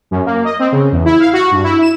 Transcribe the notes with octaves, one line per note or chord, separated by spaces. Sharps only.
F#2
A#3
D#5
C4
C#3
E2
E4
F5
F#4
G2
E4
E7